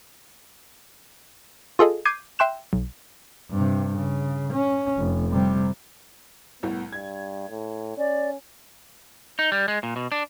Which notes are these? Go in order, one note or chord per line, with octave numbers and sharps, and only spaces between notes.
F4 G#4 A4 D#5
D6 G6 G#6 C7 D#7
E5 G5 C6 F#6 E7
B1
G2 C3
C#3
C#4
F1
C3 G3
C2 A2 B3
G2 G#6
A2
C#4 D5
D#4
G3
G#3
A#2
B2
D4